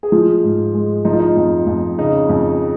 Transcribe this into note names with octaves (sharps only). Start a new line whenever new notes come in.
G#4
F3 G#3 F4
G#2
G#3
F3 D#4
F4
D#4
F2
F2
C#3 D#4
F2